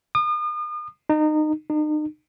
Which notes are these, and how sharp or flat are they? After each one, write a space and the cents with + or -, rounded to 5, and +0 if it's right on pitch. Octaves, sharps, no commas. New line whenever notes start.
D#6 -40
D#4 -25
D#4 -40